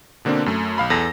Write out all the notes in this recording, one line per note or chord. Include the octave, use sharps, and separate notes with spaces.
B2 D3 A#3 C4 D4
F#2 A3
B1 F5 B5
E2 A4 A#6